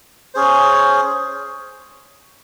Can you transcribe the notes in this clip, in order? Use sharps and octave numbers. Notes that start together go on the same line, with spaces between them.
C#4 G#4 C5